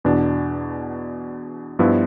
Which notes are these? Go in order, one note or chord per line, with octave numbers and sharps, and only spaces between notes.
E2 B2 B3 D4
G2 F3 B3 E4